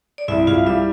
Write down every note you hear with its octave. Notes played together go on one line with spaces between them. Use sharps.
D5
C2 E4 E5
C2 F4 F5
G3 E4 E5